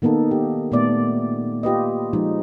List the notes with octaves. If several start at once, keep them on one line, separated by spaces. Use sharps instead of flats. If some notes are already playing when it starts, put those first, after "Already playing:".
D#3 A#3 B3 D#4 A4
G4
A#2 A3 B3 D5
F4 G4 B4 D#5
F3 G#3 D#4